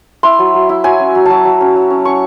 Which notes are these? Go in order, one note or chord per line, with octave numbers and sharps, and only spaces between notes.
E4 C6
F#3
F#3
E4
F#3 G#5
C#4
F#3
F#3 A5
F#3
C#4
F#3
C#4
C#4 C#6